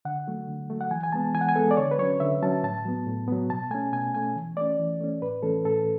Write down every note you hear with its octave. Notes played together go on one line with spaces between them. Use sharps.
D3 F#5
F#3 A3
D3
F#3 A3
F#5
E3 G#5
G#5
G#3 B3 A5
E3 G#5
F#5
G#5
G#3 B3 A4
D5
D3 C#5
B4
F#3 C#4 C#5
D3 E5
F#3 C#4 A5
A2 A5
F#3 B3
A2
F#3 B3
B2 A5
A3 C#4 G#5
B2 G#5
A3 C#4 G#5
E3
A3 C#4 D5
E3
A3 C#4
A2 B4
E3 A3 C#4 A4
A2 A4